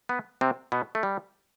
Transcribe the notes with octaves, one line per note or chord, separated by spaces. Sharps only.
B3 B4
C3 C4
B2 B3
A3
G3